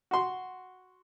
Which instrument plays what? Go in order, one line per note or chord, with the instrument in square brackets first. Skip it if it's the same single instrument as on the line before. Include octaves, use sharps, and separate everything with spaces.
[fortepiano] F#4 C6